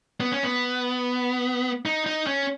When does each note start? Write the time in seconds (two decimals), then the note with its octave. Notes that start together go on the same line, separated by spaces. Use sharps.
0.20 B3
0.32 C#4
0.43 B3
1.86 D#4
2.06 D#4
2.27 C#4